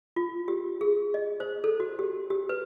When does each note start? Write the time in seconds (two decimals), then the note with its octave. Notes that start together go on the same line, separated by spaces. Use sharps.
0.16 F4
0.48 G4
0.81 G#4
1.14 D#5
1.40 C5
1.64 A4
1.80 F#4
1.99 G4
2.30 G4
2.49 B4